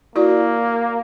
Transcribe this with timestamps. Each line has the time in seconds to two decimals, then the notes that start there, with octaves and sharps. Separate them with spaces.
0.16 A#3 E4 F#4 D5